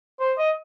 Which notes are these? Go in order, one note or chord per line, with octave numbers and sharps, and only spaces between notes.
C5
D#5